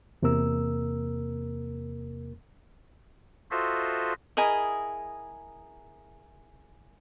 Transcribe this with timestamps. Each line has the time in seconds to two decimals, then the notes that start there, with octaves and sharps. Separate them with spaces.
0.22 E2 C3 A#3 A#4 E6
3.51 F4 F#4 A4 C5 D#5 E5
4.37 E4 G#4 A#4 D#5